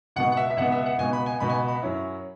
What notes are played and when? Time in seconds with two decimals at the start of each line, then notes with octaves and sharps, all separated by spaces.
0.16 C#2 B2 B3 F#5
0.32 F#5
0.37 E5
0.50 E5
0.57 C#2 B2 B3 F#5
0.72 E5
0.86 F#5
0.98 C#2 B2 B3 G#5
1.13 B5
1.26 G#5
1.40 C#2 B2 B3 B5
1.49 G#5
1.54 B5
1.68 B5
1.82 F#2 F#3 C#4 E4